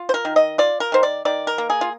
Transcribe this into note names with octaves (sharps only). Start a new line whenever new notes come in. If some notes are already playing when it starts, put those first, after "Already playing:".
Already playing: F4
C5
A#4
D#3
D#5
F4 D5
A#4
D#3 C5
D5
D#3 D5
A#4
A#3
G#4
F4